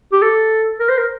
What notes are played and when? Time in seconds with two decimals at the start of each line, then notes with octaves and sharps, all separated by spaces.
0.12 G4
0.22 A4
0.80 A#4
0.89 C5
0.98 A#4